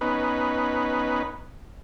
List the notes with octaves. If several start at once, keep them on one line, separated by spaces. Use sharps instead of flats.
B3 C#4 D#4 B4